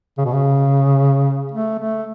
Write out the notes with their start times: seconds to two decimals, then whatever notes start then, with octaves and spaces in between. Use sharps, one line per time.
0.18 C#3
0.25 B2
0.33 C#3
1.52 A3
1.79 A3